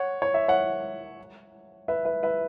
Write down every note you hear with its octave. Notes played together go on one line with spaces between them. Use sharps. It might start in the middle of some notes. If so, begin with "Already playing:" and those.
Already playing: C#5 F#5
C#5
E5
C#5 F#5
B4 E5
B4 E5
B4 E5